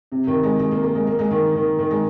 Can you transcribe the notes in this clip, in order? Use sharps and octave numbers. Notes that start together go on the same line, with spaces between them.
C3
D#3
G#3
G#3
A#3
A#3
G#3
A#3
G#3
D#3
D#3
D#3
G#3